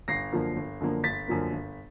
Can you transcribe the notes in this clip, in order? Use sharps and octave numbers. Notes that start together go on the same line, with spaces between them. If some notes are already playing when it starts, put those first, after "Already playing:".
G1 A#6 C7
F#2 D3 F3 A#3
G1
F#2 D3 F3 A#3
G1 A6 B6
F#2 D3 F3 A#3
G1